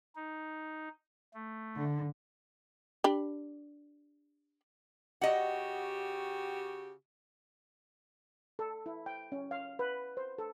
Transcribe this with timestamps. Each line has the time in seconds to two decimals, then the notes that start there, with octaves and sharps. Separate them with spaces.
0.16 D#4
1.34 A3
1.76 D3
3.04 D4 G4 B5
5.21 C#3 F#4 G4 D#5 F#5
8.59 A4
8.86 E4
9.06 G5
9.32 C#4
9.51 F5
9.79 B4
10.17 C5
10.38 A4